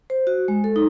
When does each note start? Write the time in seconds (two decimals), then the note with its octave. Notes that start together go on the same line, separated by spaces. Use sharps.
0.10 C5
0.27 F#4
0.48 G#3
0.64 A4
0.76 D#4